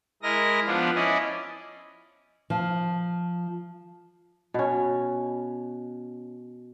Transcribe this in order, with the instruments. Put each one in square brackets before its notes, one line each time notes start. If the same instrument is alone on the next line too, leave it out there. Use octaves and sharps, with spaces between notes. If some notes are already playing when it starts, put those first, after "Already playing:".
[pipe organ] G#3 E4 A#4 D#5 A#6
F3 B3 D4 F4
C#4 E4 D5 D#5
[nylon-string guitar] F3
[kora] B2 C#4